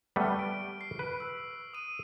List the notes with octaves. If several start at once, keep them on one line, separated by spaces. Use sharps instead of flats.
G3 A3 B3 C#6 F6
D7
C7
B4
E6
D#6 D#7